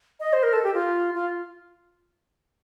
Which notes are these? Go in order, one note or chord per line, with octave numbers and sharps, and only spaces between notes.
D#5
C5
A#4
A4
G4
F4
F4